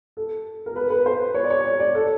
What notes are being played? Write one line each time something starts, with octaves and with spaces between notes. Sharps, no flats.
A4
A#4
B4
B4
C5
C#5
D5
C#5
C#5
D5
A4